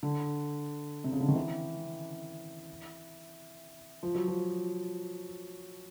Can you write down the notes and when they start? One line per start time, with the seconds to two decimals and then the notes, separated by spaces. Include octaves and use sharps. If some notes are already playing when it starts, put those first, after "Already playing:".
0.03 D3
1.04 C3
1.12 C#3
1.21 D3
1.28 D#3
1.35 E3
4.03 F3
4.15 F#3
4.28 F3